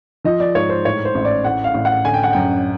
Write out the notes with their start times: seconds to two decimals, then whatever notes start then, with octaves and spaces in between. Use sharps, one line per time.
0.24 F3 D#5
0.40 D5
0.55 G#2 C#5
0.69 C5
0.85 A2 C#5
1.05 C5
1.15 A1
1.25 D5
1.44 A2 F#5
1.64 F5
1.74 A1
1.85 F#5
2.05 D3 G#5
2.14 G5
2.23 F#5
2.33 F#2 G5